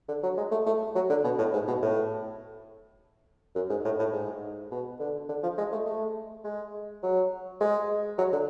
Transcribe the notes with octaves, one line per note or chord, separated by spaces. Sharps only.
D3
F#3
G#3
A3
A3
F#3
D3
B2
A2
G#2
B2
A2
F#2
G#2
A2
A2
G#2
B2
D3
D3
F3
G#3
A3
A3
G#3
F#3
G#3
F#3
D3